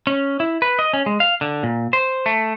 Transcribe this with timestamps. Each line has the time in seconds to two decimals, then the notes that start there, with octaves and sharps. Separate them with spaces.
0.07 C#4
0.40 E4
0.62 B4
0.79 D#5
0.93 C#4
1.06 G#3
1.20 F5
1.41 D3
1.63 A#2
1.93 C5
2.26 A3